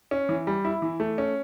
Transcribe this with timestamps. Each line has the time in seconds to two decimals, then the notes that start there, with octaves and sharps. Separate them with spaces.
0.11 C#4
0.29 E3
0.47 G3
0.65 E4
0.82 E3
1.00 A3
1.18 C#4